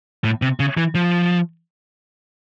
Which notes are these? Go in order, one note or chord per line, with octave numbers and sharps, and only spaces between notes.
A2
C3
C#3
E3
F3